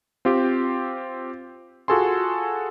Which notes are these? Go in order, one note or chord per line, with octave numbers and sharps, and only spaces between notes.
C4 F4 G4
F4 F#4 G#4 A4 G#5 C6